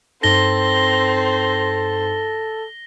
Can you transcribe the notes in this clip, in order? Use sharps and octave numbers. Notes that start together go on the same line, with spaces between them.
G2 C4 D#4 A4 C5 A#6 G7